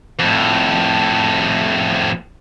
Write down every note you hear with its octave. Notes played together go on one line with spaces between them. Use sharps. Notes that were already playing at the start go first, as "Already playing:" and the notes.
F2 A2